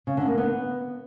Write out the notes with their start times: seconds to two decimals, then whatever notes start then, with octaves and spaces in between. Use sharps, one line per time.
0.07 C#3
0.17 D3
0.27 A#3
0.38 B3